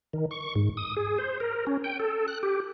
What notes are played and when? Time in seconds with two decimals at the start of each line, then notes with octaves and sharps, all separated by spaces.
0.13 D#3
0.31 C#6
0.56 G#2
0.77 D#6
0.97 G#4
1.18 C5
1.40 A#4
1.67 C#4
1.84 G5
2.00 A4
2.28 F#6
2.43 G4